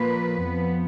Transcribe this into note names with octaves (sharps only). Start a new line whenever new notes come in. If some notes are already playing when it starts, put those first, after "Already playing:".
Already playing: A#2 F3 A#3 B4
F2 F3 B3